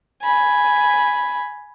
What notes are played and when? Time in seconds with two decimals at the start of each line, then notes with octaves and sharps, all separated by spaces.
0.23 G#5 B5